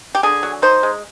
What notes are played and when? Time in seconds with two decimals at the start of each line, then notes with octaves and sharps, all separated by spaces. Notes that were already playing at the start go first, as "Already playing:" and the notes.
0.15 G4
0.23 D3 G#4
0.43 F#3
0.62 D#4 C5
0.83 G#3